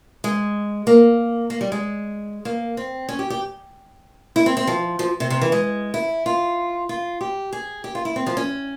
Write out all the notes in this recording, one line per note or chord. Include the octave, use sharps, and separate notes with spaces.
G#3
A#3
A#3
G3
G#3
A#3
C4
C#4
G4
G4
E4
C4
C4
F3
F3
C3
C3
E3
G#3
E4
F4
F4
G4
G#4
G4
F4
E4
C4
F3
C#4